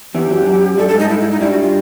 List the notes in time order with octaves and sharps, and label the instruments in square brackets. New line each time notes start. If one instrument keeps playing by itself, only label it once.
[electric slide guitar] E2 E3 [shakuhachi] G4
[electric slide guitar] F#2 F#3
F#2 F#3
[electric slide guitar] G2 G3 [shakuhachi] A4
[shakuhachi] A4
[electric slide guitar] G#2 G#3
[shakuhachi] D#4
E4
E4
D#4
[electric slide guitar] G2 G3 [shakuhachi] E4
[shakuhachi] F#4
F4